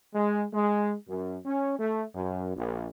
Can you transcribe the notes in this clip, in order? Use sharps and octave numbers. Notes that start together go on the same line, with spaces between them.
G#3
G#3
F#2
C#4
A3
F#2
A#1